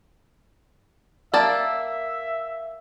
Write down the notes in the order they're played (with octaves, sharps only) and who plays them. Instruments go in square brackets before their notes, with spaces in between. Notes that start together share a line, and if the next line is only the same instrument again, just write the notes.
[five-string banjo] A#3 D5 A5 [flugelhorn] E5